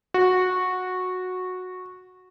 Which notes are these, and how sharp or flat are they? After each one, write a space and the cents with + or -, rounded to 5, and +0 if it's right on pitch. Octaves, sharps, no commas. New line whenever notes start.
F#4 -10